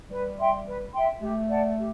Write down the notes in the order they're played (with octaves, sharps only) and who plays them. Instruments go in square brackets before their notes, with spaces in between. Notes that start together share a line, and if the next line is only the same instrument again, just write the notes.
[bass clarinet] G3 [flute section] B4
[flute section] E5 G5 C6
B4
E5 G5 C6
[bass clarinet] A3 [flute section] G4
[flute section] D5 F#5 A5
G4